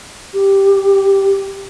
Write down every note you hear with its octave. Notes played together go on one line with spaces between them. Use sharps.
G4